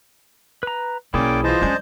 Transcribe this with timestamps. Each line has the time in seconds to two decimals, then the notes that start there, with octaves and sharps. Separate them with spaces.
0.63 B4 A#5
1.14 B1 A#3 C#4 E4 G#4 D5 G5 D6
1.44 E3 F4 C5 D#5 A5
1.62 F#3 G#3 C#4 D4 G#4 D5 G6